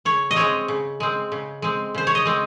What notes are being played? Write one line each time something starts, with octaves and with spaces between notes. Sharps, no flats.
C#3 C#5
D#5
G#3 C4 C#5
C#3
G#3 C4
C#3
G#3 C4
C#3 C5
C#5
D#5
G#3 C4